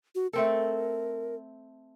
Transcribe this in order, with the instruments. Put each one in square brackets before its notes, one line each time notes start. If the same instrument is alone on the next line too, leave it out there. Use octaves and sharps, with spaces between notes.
[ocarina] F#4
[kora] A3 C4 A4 [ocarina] A#4